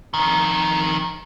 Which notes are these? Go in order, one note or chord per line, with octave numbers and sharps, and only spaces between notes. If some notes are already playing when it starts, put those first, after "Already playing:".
F2 D#3